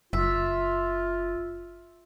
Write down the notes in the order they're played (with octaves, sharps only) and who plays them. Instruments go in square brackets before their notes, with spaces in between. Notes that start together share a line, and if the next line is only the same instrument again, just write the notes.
[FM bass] F#1 [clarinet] F4 [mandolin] E5